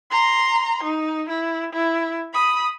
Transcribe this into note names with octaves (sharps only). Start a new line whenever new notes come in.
A#5 C6
D#4
E4
E4
B5 D#6